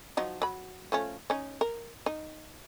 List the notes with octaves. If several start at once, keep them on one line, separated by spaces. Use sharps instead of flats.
F3 F#3 D#4
F#3 B5
F3 A3 C#4
C#4 D#4
A#4
D#4